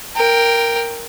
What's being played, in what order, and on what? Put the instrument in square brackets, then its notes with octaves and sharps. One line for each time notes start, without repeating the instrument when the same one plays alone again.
[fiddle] A#4 G5